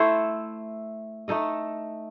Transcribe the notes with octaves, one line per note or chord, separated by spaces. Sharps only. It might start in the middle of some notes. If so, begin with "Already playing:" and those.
Already playing: A3 E4 A4 C5
A3 D#4 A4 D#5